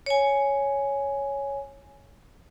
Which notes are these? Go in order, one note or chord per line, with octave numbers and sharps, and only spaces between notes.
C#5 G#5